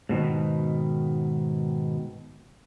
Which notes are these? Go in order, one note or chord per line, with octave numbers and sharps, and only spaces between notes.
G#2 B2 D#3